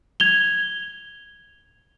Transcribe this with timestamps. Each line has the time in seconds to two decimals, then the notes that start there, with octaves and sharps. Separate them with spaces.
0.20 G#6 F7 G7